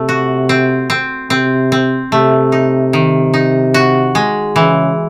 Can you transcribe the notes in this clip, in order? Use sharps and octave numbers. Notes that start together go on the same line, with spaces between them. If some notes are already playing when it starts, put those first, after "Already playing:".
Already playing: C3 A3
F#4
C4
C4
C3 C4
C4
C3 A3
D#4
D#3
D#4
F#4
G#3
C#3 E3